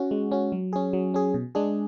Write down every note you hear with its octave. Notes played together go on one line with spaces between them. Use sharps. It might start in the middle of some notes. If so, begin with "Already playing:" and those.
Already playing: C#4 F#4
G#3
C#4 F#4
F#3
C#4 G#4
F#3
C#4 G#4
B2
G#3 D4 G#4